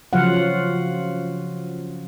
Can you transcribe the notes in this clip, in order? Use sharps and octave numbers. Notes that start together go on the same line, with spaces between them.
C#3 F3 F#3 F4 F5 F#5